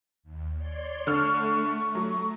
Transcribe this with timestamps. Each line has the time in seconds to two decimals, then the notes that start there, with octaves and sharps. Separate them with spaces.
0.23 D#2
0.56 C#5 D5 C6
1.07 D3 A3 C#6 F6
1.95 F#3